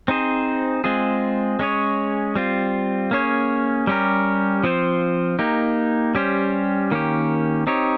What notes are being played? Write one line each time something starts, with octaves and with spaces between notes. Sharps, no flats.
C4 D#4 G#4 C5
G#3 C4 F4 G#4
G#3 C#4 G#4 C#5
G3 C4 F4
A#3 C#4 G#4 C#5
G3 C#4 G4 A#4
F3 C4 F4 C5
A#3 D#4 G4
G3 C#4 G4 C5
D#3 A#3 C#4 G4
C4 D#4 G4 C#5